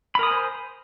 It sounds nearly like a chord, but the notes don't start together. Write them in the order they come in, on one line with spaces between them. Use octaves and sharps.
B5 A#4 D#6 G#5 C5